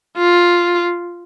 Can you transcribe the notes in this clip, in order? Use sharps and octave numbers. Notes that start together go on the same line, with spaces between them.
F4